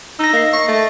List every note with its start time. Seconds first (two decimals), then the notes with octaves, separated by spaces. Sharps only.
0.19 D#4 E6 A#6
0.33 A#3 D#5 A#6 C7
0.53 C#6
0.68 A3